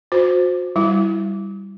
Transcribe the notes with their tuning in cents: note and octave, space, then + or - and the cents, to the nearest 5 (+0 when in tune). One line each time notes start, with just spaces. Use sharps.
F#4 -35 C5 +0
G3 +0 E4 +0